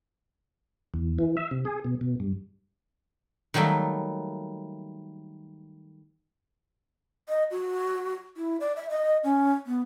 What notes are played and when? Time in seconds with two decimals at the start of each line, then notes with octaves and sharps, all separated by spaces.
0.94 E2
1.19 E3
1.37 E5
1.51 C3
1.65 G#4
1.84 B2
2.01 B2
2.20 G2
3.54 D#3 F#3 G3 A3 A#3 A4
7.29 D#5
7.51 F#4
8.37 E4
8.60 D5
8.76 E5
8.90 D#5
9.24 C#4
9.66 B3